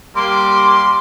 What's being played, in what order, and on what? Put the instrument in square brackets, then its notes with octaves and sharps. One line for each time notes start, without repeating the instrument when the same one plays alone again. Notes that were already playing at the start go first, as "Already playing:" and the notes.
[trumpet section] G3 A#3 D6 [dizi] C6